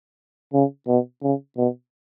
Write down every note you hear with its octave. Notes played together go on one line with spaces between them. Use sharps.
C#3
B2
C#3
B2